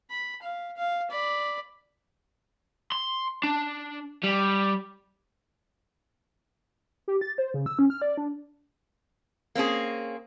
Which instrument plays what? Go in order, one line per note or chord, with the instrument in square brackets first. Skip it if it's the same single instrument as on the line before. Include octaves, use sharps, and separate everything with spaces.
[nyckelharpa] B5
F5
F5
D5 B5
[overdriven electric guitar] C6
D4
G3
[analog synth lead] G4
A6
C5
C#3
E6
C#4
F6
D5
D4
[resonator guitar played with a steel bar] A#3 C4 C#4 G#4